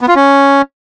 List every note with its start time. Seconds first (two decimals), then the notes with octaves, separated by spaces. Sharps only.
0.01 B3
0.09 F4
0.16 C#4